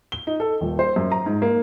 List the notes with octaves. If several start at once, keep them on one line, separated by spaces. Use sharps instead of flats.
G7
D#4
A4
D#1
C5
F#2
A#5
G#2
A#3